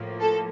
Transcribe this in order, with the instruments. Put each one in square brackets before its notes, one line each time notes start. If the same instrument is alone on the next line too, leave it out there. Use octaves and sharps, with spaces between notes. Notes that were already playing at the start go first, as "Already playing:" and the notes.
Already playing: [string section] A2 F3 A#3
A4